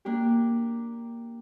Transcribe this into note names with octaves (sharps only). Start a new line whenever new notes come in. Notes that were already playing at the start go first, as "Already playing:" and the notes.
A#3 D4 G4